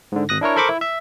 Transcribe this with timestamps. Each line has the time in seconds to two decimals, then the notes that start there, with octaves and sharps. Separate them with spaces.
0.12 G#2 D3
0.29 G#1 D#6 F#6 A#6
0.41 D4 E4 A#4 C#5
0.56 A4 A#4 C5 B5 C#6 D6
0.69 E4
0.81 E5